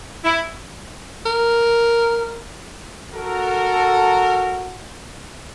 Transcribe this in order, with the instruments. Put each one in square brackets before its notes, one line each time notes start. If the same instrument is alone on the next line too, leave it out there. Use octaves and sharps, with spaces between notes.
[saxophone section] E4
[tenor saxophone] A#4
[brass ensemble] F#4 A4 A#4